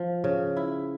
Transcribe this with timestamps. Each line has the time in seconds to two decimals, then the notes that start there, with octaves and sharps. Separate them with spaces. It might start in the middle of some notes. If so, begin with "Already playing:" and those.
Already playing: F3
0.24 C#3
0.57 E4